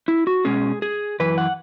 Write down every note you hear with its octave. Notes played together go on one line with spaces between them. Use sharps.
E4
F#4
B2 G#3 C#4 G#4
G#4
F#2 E3 B4
F#5